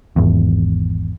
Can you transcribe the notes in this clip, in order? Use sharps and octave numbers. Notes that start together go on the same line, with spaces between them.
G#1 E2